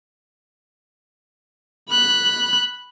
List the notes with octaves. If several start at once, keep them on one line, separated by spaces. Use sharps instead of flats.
B5 F#6